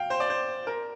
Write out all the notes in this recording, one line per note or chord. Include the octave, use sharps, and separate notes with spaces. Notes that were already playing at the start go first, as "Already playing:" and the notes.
Already playing: F5 G5
C5
D5
C5
A#4